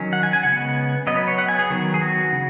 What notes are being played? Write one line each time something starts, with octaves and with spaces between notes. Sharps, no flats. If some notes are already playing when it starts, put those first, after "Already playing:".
Already playing: D#3 F#3 C#4
F#5
G#5
G#5
C#3 G#3 B3 F#5
F#3 B3 D#5
B4
C#5
F#5
G#5
G#4
D#3 F#3 B3
G#4
F#4
C#3